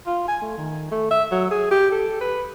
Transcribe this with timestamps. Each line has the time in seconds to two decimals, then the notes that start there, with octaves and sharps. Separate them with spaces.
0.06 F4
0.28 G#5
0.41 A3
0.57 D#3
0.91 A3
1.11 E5
1.32 F#3
1.51 G#4
1.71 G4
1.92 A4
2.21 B4